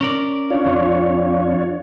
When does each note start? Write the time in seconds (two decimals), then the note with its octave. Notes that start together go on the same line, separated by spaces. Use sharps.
0.01 C#4 A#4 D5
0.50 D4 F4 C#5
0.66 F2